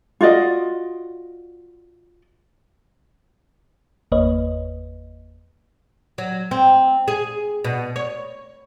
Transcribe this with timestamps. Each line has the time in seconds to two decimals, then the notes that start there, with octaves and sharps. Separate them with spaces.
0.21 F4 F#4 D5 D#5
4.12 G1 E2 A#3 B4 C#5 D#5
6.18 F#3
6.51 C4
7.08 G#4
7.64 B2
7.96 C#5